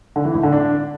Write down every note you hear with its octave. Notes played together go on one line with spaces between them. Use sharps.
D3
E3
A2
D3
D4